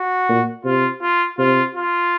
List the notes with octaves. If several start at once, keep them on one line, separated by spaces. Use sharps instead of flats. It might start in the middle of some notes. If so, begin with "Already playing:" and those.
Already playing: F#4
A#2
C3 F4
F4
C3 F4
F4